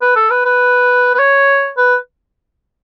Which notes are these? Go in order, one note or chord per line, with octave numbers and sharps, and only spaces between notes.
B4
A4
B4
B4
B4
C#5
B4